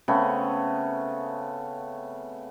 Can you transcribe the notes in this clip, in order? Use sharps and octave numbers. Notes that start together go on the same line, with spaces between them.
C#3 A3 B3 C4